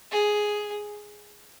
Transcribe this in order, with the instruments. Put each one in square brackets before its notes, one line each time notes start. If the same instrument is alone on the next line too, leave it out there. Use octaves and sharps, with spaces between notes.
[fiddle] G#4